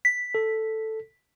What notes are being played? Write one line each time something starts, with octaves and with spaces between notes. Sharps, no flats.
B6
A4